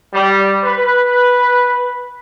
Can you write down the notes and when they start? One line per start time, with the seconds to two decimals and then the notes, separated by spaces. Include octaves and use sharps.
0.14 G3
0.64 B4